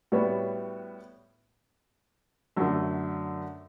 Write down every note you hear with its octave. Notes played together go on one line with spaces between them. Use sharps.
A2 G3 B3 F#4 C#5
F#2 D3 F#3 A3